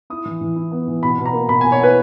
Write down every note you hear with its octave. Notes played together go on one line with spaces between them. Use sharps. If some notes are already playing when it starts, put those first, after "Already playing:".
E4 D#6
E3
E3
E4
B3
E3
B2 B5
B2
A#5
A#3
B2 B5
G#5
B2
C#5
E4 B4